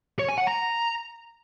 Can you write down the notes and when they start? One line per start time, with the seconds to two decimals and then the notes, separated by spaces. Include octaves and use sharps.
0.19 C#5
0.28 G#5
0.38 F#5
0.47 A#5